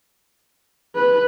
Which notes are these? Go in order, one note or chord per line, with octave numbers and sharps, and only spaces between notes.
B4